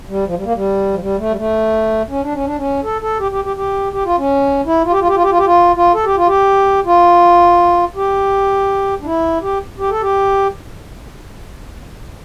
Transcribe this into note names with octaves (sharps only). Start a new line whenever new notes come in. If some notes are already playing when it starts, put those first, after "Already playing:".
G3
F3
G3
A#3
G3
F3
G3
A3
G3
A3
C#4
D4
C#4
D4
C#4
A4
A4
G4
G4
G4
G4
G4
F4
C#4
E4
F4
G4
F4
G4
F4
G4
F4
G4
F4
F4
A4
G4
F4
G4
F4
G4
D4
E4
G4
G4
A4
G4